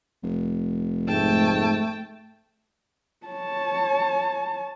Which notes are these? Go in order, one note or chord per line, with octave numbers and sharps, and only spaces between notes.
F1
G#2 A3 G5 A5
C#5 A5